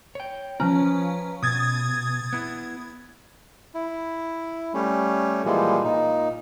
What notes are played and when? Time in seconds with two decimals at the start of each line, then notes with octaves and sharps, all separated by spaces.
0.15 C#5 G5
0.60 F3 C#4 B4 A#5
1.43 B2 D#6 G#6 A6
2.33 B3 E4
3.74 E4
4.74 G3 A3 C#4
5.45 A#2 E3 F3 G3 G#3
5.85 A#2 D#4